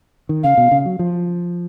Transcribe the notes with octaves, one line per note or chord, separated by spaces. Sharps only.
D#3
C#3 F5
B2
C#3
F#3
F3